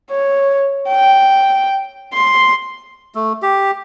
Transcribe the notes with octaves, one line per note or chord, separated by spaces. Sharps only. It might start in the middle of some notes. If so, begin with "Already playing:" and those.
C#5
G5
C6
A3
G4